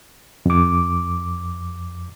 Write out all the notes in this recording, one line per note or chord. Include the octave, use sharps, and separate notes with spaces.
F2 D6